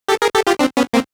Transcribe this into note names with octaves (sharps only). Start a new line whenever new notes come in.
G4 A4
G#4 A#4
G4 A4
F4 G4
C4 D4
B3 C#4
A#3 C4